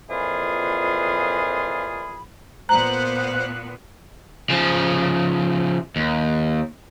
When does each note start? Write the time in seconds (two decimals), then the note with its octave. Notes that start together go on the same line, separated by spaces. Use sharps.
0.10 F2 A#2 E3 F4 G#4 B5
2.69 A#2 B3 C5 A#5 F#6
4.50 C#3 F3
5.96 D#2